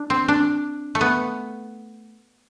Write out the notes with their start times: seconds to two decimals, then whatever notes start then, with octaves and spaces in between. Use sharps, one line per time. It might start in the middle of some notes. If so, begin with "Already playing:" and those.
Already playing: D4
0.10 C4
0.28 D4
0.95 A3
1.01 B3